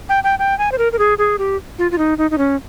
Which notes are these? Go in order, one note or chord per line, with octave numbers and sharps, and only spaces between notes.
G5
G5
G5
G#5
C5
A#4
A#4
G#4
G#4
G4
F4
F4
D#4
D#4
D#4
C#4